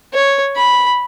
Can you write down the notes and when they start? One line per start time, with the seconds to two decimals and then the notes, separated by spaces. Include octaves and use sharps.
0.14 C#5
0.57 B5